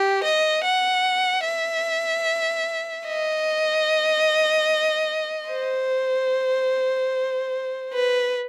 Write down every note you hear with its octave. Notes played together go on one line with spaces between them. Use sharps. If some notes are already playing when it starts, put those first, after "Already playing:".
Already playing: G4
D#5
F#5
E5
D#5
C5
B4